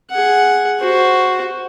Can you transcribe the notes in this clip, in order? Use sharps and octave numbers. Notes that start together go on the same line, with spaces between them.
G#4 F#5
F#4 C5